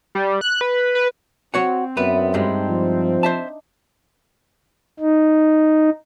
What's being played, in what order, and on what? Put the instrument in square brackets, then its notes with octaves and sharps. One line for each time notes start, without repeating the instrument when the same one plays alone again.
[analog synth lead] G3
F#6
B4
B4
[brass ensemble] C4 [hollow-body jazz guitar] F#4 C#5 F#5
[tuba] F#2 [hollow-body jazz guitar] B3 B4 [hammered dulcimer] E4 D5 E5
[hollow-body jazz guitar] G2 G3 G#3 [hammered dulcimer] D4 D#4
[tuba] F3
[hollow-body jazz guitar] C5 E5 A5
[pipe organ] D#4